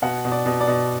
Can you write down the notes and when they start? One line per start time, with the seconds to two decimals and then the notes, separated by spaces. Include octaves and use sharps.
0.02 B2 F#5
0.25 B2
0.32 D5
0.46 B2
0.61 D5
0.68 B2